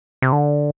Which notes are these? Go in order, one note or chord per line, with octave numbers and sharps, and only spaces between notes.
C3
D3